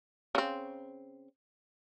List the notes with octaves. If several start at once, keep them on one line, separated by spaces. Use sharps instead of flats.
C#3 C4